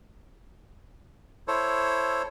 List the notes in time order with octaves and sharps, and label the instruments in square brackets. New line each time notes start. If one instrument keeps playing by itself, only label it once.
[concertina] E4 A4 C5 C#5